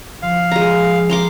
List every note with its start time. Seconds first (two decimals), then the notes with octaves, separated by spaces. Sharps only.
0.22 F3 F5
0.52 G#3 A#5
1.10 A#5 C6 D6